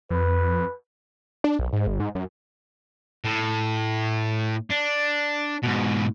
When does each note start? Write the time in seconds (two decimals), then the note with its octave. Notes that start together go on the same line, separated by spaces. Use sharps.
0.10 F2 B4
1.44 D4
1.59 B1
1.73 G#2
1.87 G1
2.00 G#2
2.15 F#2
3.25 A2
4.71 D4
5.63 G#2 B2